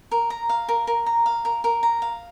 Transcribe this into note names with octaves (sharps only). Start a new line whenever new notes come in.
A#4
A#5
F5
A#4
A#4
A#5
F5
A#4
A#4
A#5
F5